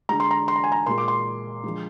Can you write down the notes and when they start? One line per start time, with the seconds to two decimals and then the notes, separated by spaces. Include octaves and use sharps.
0.09 D3 G#3 A#5
0.20 C6
0.31 A#5
0.48 C6
0.56 A#5
0.64 G#5
0.72 A#5
0.86 A#2 G#3 C6
0.98 D6
1.08 C6
1.64 D3 F3 G#3